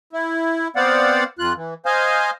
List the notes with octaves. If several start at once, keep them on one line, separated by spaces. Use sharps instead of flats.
E4
B3 C4 C5 D5 F5 F#5
F2 F4 F#6
E3
C5 D#5 F5 G#5